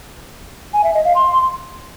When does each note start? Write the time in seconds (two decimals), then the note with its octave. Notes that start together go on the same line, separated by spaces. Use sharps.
0.73 G#5
0.84 E5
0.94 D#5
1.05 F5
1.15 C6